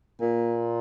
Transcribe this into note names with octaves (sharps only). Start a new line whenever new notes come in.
A#2